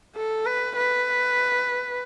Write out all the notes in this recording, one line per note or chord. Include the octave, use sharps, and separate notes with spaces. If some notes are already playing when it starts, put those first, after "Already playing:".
A4
B4
B4